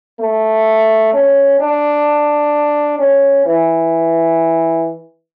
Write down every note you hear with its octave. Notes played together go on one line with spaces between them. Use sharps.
A3
C#4
D4
C#4
E3